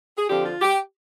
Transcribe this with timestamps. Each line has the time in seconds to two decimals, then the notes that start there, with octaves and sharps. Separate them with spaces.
0.18 G#4
0.29 F2 D3 F3 G4
0.45 F4
0.62 G4